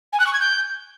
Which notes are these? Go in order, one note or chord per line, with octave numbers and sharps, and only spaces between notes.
G#5
F#6
C#6
G#6
G6